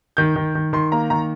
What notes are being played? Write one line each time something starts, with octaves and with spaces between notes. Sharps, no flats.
D#3 G6
D#3
D#3
D#3 C6
A#3 A#5
D#3 A#5